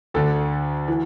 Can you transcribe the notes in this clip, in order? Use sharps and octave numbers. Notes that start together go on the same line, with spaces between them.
D2 D3 A4
E3